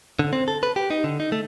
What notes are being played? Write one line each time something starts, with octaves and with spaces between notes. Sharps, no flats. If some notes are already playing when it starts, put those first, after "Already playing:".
D3
C4
A4
B4
G4
D#4
D3
D#4
A3